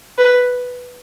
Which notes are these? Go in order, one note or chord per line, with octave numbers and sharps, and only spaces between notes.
B4